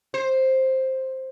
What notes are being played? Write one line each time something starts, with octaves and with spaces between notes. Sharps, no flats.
C5